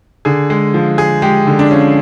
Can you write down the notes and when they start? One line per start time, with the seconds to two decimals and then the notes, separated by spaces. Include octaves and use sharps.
0.25 D3 G#4
0.50 G#3
0.74 F3
0.98 G#3 G#4
1.22 G#3 G4
1.47 D3
1.59 D4
1.71 F3 C#4